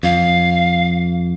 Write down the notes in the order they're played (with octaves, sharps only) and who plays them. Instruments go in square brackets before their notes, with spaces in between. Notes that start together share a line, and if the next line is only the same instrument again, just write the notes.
[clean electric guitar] F2 [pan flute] F5